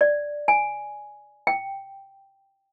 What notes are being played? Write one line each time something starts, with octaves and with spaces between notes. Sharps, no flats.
D5
G#5
G5